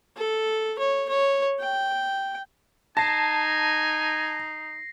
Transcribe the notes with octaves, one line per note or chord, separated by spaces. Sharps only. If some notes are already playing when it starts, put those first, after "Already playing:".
A4
C#5
C#5
G5
D#4 G#5 A5 A#6 C7